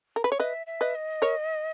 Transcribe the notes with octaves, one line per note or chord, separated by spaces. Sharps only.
A#4
B4
C#5
B4 D#5 E5
E5
B4 D#5
D#5
A#4 C#5